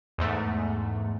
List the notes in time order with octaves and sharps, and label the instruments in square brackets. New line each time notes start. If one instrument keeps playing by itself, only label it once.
[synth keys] E2 G#2 A3